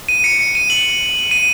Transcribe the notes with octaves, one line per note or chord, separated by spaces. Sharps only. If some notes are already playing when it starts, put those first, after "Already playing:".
D#7
C#7
C#7
D#7
F#7
D#7